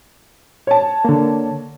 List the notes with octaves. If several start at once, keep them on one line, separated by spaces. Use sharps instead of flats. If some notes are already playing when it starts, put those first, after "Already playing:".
C#5 A5
D3 A#3